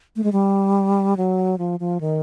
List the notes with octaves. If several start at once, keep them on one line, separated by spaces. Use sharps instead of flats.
A3
G#3
G3
F#3
F3
F3
D#3